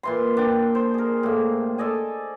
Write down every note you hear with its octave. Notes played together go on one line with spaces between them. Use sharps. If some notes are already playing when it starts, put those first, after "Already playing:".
A#2 E3 C6
D4 G5
C5
G#4 A#4
A2 A#3
A4 D5 D#5 G#5